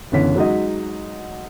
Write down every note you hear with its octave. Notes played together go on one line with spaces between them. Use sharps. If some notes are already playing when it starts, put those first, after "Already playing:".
F#1 D3 E3 B3 C#4 B6
F#3 G#3 D#4 F#4 D#5